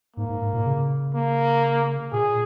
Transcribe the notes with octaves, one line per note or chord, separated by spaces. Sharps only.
G#2 A#3
G#2
G#2
A#2
C#3
A#3
A#2 G#4